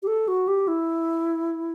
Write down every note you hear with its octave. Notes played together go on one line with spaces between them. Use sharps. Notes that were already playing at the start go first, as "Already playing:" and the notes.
G4
A4
F#4
G4
E4